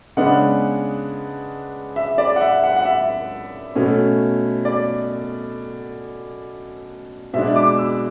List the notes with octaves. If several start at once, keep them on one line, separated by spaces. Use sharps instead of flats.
C#3 G#3 B3 D4 F#5
E5
D5
F#5
E5
F#5
F#5
E5
B2 A3 C#4
D5
B2 G#3 D4 E5
D6
E6